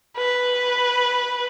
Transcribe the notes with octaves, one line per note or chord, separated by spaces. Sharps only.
B4